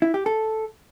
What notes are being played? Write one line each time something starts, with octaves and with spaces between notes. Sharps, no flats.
E4
G4
A4